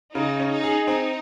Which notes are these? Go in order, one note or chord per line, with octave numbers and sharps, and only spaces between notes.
C#3 D#4
C#4
D#4
G#4
C4 D#4